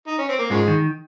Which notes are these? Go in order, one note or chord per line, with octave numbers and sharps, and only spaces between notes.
D#4
C#4
C4
A#3
G#2 C#3 F3 G#3
D#3